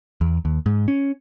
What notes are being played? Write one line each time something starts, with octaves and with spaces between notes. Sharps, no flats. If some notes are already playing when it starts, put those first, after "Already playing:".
E2
D#2
G#2
C#4